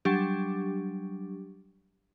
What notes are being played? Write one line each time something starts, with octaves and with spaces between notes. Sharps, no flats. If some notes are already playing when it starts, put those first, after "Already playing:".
F#3 G3 D4 G4